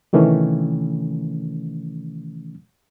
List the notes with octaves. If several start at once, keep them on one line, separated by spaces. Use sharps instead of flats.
C3 D#3 E3 A3 C#4